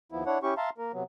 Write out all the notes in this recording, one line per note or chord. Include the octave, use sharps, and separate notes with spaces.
D#2 F3 B3 E4
D4 E4 C#5 F#5
C#4 E4 G4 C#6
E5 F5 A5 A#5 C6
A#3 A#4
C3 F#3 B3